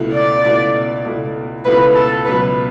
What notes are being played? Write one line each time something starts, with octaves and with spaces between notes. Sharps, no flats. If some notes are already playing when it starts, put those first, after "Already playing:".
Already playing: C#2 B2 A3 E4
D5
C#2 B2 A3 E4
C#2 B2 A3 E4
C#2 B2 A3 E4 B4
A4
C#2 B2 F#3 B4